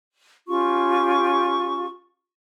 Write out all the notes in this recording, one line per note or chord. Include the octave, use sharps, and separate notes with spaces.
C#4 F4 G4 C#6